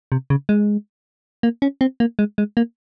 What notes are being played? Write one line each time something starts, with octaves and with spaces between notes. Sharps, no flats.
C3
C#3
G#3
A#3
C#4
C4
A#3
G#3
G#3
A#3